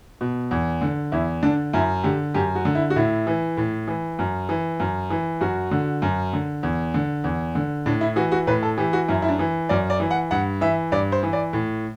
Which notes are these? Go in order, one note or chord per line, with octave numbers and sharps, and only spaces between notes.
B2
E2
D3
E2 E4
D3 D4
F#2 E4
D3 G4
F#2 G4
F#4
D3
E4
F#4
A2 E4
E3
A2
E3
F#2
E3
F#2
E3
F#2 F#4
D3
F#2
D3
E2
D3
E2
D3
A2 D4
E4
E3 F#4
F#4
A2 B4
A4
E3 G4
F#4
F#2 E4
E4
D4
E3
F#2 D5
D5
E3
F#5
G2 F#5
E3 E5
G2 D5
C5
E3
D5
A2